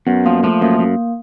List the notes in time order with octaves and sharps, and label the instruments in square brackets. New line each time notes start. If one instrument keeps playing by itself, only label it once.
[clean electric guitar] F#2 [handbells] B3
[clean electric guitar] F3 [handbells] A#3
[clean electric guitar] F3 [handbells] A3
[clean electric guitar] F#2 [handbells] A#3
[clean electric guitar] F#2